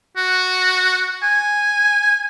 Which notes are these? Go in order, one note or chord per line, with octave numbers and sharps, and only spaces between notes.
F#4
G#5